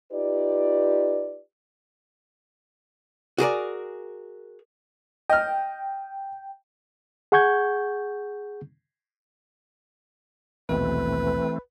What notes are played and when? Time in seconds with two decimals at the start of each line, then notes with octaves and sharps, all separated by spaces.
0.13 D#4 F4 G4 B4 D5
3.38 F#4 G#4 A#4 D5
5.29 D#5 G5 F6
7.32 G#4 F#5 C#6 G6 G#6
10.69 A#1 D#2 B2 E3 A3 C4 B4